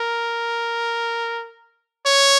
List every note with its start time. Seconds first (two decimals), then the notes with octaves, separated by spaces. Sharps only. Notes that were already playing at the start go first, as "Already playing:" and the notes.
Already playing: A#4
2.06 C#5